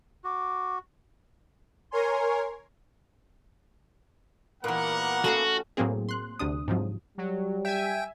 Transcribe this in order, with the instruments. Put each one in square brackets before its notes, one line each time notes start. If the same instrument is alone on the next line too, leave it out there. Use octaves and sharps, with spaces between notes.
[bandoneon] F#4 [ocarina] D6
[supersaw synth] A#4 C#5 G#5 C6
[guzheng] A#2 E3 [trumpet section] G3 A#4 F#5 [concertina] A#3 B3
[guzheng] A3 C#4 F5 [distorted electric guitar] F#4
[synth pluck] A2 F#3 A#3 C4 G#4
C6 F#6
D2 C3 D4 D#6
G#2 C3 F3 F#3
[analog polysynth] F#3 [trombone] G3
[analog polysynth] E5 G#5 [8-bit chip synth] G5